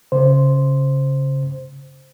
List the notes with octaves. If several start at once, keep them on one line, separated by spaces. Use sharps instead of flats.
C#3 C5